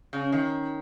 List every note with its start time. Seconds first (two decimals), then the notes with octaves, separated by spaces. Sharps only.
0.13 C#3
0.32 D#3